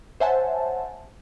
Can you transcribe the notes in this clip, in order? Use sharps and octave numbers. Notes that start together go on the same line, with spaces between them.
C5 C#5 E5 F#5 G#5 A5